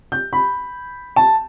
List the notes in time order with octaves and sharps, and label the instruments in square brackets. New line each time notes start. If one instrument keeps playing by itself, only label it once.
[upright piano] G6
B5
A5